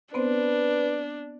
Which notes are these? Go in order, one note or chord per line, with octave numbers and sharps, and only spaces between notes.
B3 C4 D4 B4 C5